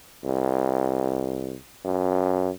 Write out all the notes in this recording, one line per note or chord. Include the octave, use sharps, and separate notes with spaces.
C2
F#2